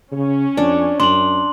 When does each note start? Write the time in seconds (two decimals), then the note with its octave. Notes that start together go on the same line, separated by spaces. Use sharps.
0.12 C#3 C#4
0.57 F2 D4
1.00 F#2 D4 C6 F#7